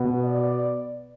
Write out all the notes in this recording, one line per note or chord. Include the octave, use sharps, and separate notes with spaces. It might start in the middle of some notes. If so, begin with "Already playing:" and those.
Already playing: B2 B3
D5